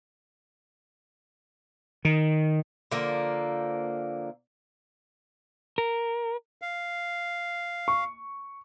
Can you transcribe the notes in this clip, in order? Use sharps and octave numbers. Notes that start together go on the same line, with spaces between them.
D#3
D3 F3 A#3
A#4
F5
C#6